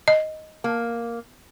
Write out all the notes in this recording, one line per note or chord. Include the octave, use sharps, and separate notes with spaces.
D#5
A#3